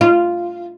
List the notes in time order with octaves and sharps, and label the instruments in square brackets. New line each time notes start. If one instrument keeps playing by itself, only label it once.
[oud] F4